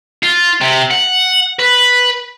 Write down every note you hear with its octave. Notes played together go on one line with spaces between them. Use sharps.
F4
C3
F#5
B4